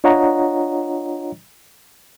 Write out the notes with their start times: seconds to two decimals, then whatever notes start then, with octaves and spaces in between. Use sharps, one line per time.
0.04 D4 F4 C#5 D#5 F#5 A#5